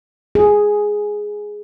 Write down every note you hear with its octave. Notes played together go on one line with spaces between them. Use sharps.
G#4